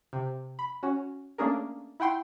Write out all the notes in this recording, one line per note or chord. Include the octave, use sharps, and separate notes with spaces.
C3
B5
C#4 F#4
A3 A#3 C#4 D4 G#4 A#4
E4 F#5 G5 C6